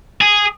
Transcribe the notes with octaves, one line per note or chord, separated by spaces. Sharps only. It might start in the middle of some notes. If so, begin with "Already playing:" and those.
G#4